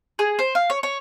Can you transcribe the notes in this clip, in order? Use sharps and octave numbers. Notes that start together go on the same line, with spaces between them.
G#4
C5
F5
C#5
C#5